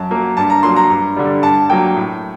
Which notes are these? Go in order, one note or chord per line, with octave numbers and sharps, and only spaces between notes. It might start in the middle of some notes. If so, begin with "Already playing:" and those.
Already playing: F#2 A5
F#3 A#3
G2 A5
A#5
F#3 A#3 C6
A#5
G2
D3 G3
G2 A5
F#3 A#3 G5
A2